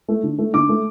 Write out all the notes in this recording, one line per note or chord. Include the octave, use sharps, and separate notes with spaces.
A3
D3
A3
D3 D6
A3